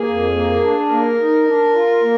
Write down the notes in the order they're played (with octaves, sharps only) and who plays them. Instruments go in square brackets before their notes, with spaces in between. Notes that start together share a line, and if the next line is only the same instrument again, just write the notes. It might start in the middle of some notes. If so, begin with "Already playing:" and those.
Already playing: [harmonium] A#3 [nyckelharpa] G#4
[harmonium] F2
A#3
D4
[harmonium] A#3 [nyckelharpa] A#4
[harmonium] D#4
D4
F4
A#3